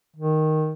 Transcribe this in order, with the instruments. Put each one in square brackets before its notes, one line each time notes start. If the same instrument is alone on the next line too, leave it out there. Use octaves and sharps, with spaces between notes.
[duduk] D#3